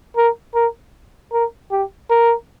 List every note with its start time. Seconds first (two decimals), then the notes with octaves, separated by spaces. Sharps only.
0.17 A#4
0.55 A#4
1.32 A#4
1.71 G4
2.10 A#4